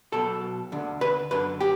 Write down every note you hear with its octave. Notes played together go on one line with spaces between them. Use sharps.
B1 B2 A4
D2 D3
B4
F#2 D3 B4
G4